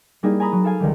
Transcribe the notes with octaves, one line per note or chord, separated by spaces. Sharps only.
G3 A#3 D#4 E4 G#4
G#5 A#5 B5 D#6 A#6
F#3
A4 F5 G#5
C#2 D#3 G3